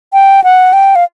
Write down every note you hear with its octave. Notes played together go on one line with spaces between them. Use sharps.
G5
F#5
G5
F5